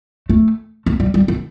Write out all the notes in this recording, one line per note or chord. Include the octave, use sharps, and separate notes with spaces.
A3
A3
G3
G3
A3